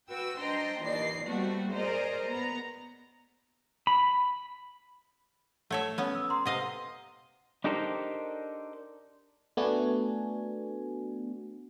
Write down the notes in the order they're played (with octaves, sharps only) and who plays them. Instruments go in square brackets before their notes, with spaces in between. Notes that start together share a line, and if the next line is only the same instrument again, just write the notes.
[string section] F#4 B4 G5 E6
D4 C5 D#5 G5 A#5 C6
D#2 A#2 E3 D5 D#5 C7
B2 G3 A3 A#3 C4 F#4
G#4 A#4 C5 D5 D#5 A#5
B3 A#5
[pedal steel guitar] B5
[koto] A3 C#5 E5 [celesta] F#5 A5
[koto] B3 C#4
[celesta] E6
A#5 C6
[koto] C3 D#5 F5 [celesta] B4 F#5
[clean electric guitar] D4 D#4 G4 A4 A#4 C5
[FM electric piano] A3 B3 D4 F#4 G#5